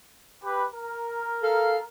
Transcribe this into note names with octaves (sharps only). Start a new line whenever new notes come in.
G4 B4
A#4
A4 F5